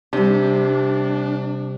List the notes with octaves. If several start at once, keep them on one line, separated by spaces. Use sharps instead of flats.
C3 G3 D4